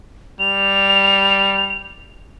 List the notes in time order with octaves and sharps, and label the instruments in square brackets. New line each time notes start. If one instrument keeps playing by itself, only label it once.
[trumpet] G3 [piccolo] F7